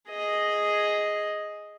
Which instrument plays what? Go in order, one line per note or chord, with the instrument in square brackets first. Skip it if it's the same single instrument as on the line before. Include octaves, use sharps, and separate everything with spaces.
[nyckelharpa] G#4 D#5